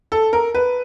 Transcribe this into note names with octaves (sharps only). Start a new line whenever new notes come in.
A4
A#4
B4